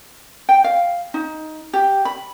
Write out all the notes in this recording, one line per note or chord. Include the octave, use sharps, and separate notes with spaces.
G5
F5
D#4
G4
B5